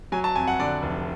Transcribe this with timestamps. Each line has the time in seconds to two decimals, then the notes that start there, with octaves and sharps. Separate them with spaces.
0.12 F#3 G#5
0.24 A5
0.35 F2 G#5
0.47 F#5
0.59 D3 D5
0.82 F1